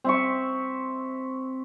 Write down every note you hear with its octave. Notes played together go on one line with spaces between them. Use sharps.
C4 E5 C#6